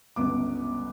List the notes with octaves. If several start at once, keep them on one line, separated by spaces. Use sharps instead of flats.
G1 C#2 B3 D6